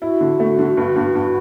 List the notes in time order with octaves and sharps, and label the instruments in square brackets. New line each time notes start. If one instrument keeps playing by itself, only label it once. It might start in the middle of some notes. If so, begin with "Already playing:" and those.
[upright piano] E4 [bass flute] F#4
[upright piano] D3
A3
D3
G2
G2
G2